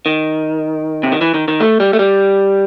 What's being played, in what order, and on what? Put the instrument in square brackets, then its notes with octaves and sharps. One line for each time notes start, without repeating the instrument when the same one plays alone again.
[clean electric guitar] D#3
C3
D#3
E3
D#3
D#3
A3
G3
A3
G3